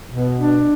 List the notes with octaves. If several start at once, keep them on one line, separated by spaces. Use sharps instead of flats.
B2
D4